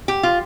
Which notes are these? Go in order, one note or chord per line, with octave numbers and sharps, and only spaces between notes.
G4
F4